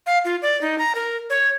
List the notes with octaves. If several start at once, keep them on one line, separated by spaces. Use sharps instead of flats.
F5
F4
D5
D#4
A#5
A#4
C#5